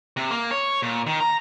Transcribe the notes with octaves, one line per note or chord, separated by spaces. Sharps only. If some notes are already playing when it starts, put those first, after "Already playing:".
C3
A#3
C#5
A#2
D#3
A#5